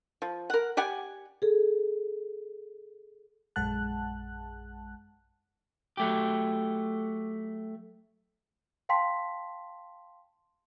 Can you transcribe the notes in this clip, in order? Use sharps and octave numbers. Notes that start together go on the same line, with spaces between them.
F3
A#4 F#5
G4 D5 F#5 G#5
G#4 A4
A#1 F#2 G#3 F#5 A5 F#6
F#3 A3 G4
F5 G5 A5 C6 B6